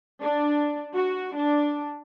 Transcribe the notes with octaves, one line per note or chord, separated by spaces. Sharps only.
D4
F#4
D4